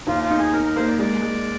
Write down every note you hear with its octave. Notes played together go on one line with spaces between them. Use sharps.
D#2 F4
F4
D#4
G#4
D#4 A#4
A#4
A#3 C5
D5
G#3 D5
G#3